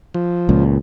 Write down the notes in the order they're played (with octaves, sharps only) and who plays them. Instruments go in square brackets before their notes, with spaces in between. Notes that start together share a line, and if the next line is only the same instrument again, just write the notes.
[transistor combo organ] F3
[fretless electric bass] C#2 A#2